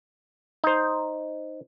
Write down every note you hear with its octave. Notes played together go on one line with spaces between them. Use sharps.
D#4 C5